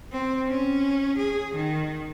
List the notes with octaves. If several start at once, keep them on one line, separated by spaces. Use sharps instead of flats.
C4
C#4
G#4
D#3